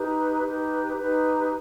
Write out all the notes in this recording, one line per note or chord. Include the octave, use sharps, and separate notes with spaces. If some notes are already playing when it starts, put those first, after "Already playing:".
Already playing: D#4 G4 B4
D#4 G4 B4
D#4 G4 B4